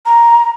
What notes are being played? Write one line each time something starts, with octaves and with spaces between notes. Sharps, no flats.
A#5